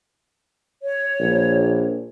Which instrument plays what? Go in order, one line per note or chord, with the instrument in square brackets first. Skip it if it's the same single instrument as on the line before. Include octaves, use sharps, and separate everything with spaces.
[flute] C#5
[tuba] A#1